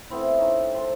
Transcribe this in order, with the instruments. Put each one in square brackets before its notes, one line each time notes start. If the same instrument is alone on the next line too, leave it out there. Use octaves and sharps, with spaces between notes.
[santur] A3 B3 C4 E4
C4 C#4 D#4
C5 A5 C6